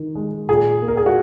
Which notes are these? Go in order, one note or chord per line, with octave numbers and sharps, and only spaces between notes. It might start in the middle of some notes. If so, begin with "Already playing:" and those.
Already playing: D#3
G#3
A#2 G#4
A#3
A#4
G#4
F#4